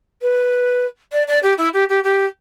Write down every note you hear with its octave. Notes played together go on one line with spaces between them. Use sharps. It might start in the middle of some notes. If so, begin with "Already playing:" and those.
B4
D5
D5
G4
E4
G4
G4
G4